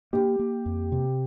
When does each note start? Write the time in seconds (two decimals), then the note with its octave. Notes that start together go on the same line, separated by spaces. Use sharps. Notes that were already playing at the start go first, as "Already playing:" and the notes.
0.13 A#3 G4
0.39 A#3
0.66 F2
0.92 C3